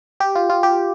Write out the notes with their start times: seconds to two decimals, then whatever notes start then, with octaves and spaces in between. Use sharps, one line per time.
0.20 G4
0.35 F4
0.49 F4
0.63 G4